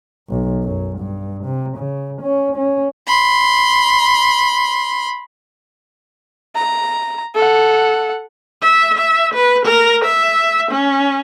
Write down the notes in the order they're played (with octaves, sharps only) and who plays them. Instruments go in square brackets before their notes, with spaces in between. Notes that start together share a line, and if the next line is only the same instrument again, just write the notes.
[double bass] B1
F#2
G2
C3
C#3
C#4
C#4
[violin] B5 C6
[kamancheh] A#5
A4 F#5
[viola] E5
E5
B4
A#4
E5
C#4